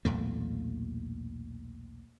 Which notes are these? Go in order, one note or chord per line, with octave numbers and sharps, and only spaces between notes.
B1 E2 A#2 A3